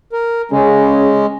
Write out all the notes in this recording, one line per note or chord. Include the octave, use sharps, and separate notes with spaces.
A#4
C#3 G#3 C#4